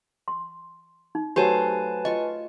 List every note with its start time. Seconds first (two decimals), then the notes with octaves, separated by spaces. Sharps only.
0.28 C6
1.15 D#4
1.36 F#3 A3 G4 B4 C5 G#5 A5
2.05 F4 D#5 C#6